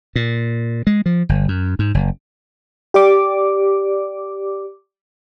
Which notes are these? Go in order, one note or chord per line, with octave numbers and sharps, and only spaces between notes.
A#2
G#3
F3
G1
F#2
G#2
F#1
G4 D5 D6